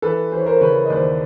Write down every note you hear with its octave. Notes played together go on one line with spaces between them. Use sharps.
E3 A4 B4
E3 C5
C#5
A#4 C5
C#3 B4 C#5
D#5
D#2 C5 D5